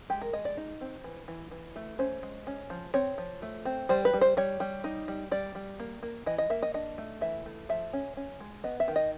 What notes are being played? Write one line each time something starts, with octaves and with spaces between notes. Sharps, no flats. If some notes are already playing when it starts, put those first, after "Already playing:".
G#3 G4
A#4
G#3 D#5
D5
D#4
C4
E3
E3
E3
A3
C#4 C5
G#3
C#4
F3
C4 C#5
F3
A3
C4
G3 C5
B4
G3
C5
G3 C#5
G3
D#4
G3
G3 D5
G3
A#3
A#3
E3 D#5
D#5
A#3 E5
D#5
D4 D#5
A3
E3 E5
A3
F3 E5
C#4
C#4
G#3
B3 D#5
E5
D#3
D#5